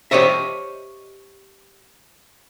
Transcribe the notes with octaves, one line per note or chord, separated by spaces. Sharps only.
G4 C5 C#5 D#5 E5